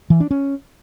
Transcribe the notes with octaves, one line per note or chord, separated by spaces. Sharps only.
E3
D4
C#4